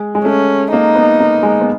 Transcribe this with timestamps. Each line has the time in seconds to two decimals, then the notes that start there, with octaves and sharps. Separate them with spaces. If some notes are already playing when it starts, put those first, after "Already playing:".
Already playing: G#3
0.15 G#3
0.24 A3 C#4
0.72 A#3 D#4
0.95 B3
1.19 A#3
1.43 G#3
1.61 B3